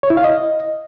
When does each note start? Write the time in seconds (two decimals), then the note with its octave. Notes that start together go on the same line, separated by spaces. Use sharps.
0.03 C#5
0.10 E4
0.17 F5
0.24 D#5